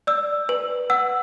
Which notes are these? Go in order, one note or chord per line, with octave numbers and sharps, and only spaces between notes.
D5 E6
B4
F#5 E6